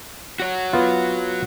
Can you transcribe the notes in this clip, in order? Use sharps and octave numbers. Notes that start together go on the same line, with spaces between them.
F#4 C#5
B3 F4